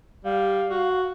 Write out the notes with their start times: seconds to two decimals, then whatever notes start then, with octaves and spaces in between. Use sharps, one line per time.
0.25 G3 F5
0.70 F#4